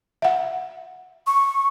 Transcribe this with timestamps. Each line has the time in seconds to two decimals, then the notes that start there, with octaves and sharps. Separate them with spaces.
0.22 E5 F#5
1.27 C#6